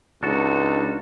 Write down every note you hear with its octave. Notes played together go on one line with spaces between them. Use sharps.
C#2 D4 D#4 F#4 A4